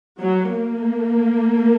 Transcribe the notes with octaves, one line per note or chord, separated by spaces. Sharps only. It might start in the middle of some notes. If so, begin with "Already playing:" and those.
F#3
A#3